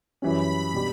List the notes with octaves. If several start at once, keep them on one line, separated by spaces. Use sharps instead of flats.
F#2 E3 G3 C#4 B5
B2 G3 D4 G4